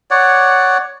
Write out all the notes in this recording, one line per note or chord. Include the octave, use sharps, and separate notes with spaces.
C#5 D5 F#5